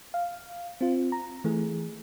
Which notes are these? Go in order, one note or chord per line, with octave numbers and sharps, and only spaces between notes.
F5
C4 F4
A#5
E3 A3 G#4